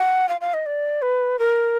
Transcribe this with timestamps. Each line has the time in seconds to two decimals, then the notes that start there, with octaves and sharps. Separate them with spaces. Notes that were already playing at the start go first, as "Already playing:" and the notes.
Already playing: F#5
0.29 F5
0.41 F5
0.54 D#5
0.66 D5
1.02 B4
1.39 A#4